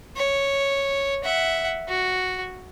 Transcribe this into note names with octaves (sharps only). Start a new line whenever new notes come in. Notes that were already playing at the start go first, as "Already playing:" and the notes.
C#5
E5 F#5
F#4